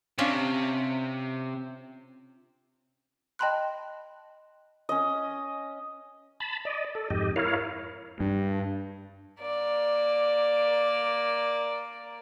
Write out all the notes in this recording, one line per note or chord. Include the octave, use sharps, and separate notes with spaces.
C3 C#4 D4 F4
D#5 G5 A5 B5 C6 F#6
C#4 D#5
A5 B5
D5 D#5
A4
F2 G#2 G4 D#5
E4 A#4 C#5 F5
G2
A#3 D5